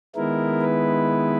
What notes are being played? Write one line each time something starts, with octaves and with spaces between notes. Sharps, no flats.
D#3 G#3 B3 E4 A#4
B4